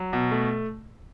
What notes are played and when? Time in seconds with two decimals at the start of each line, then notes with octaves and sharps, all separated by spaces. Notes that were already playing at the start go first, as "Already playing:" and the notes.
Already playing: F#3
0.13 B2
0.31 A3